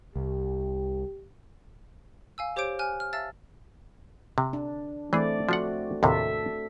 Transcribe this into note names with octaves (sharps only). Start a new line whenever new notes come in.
C2 G4
F5 G#5 E6
G4 C5 C#5 D6 G6 D7
G#5 F6 F#6
F6
E5 F5 A5 E6 A6
C3
D4
E3 A3 C4 G#4 D5
F3 D4 F#4 F#5
D#2 A2 C3 A4 E5